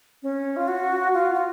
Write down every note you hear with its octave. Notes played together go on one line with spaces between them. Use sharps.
C#4
F4
F#4
F4
F4